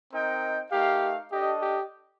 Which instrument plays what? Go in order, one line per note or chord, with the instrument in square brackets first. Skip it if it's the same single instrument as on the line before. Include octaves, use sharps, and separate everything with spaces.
[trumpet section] C4 D#4 A#4 D#5 G5
[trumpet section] A3 D#4 A#4 F5 [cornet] G4
[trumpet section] D4 A4 D#5 [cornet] G4
[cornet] G4